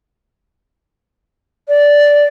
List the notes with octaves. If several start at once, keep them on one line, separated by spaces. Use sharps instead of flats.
D5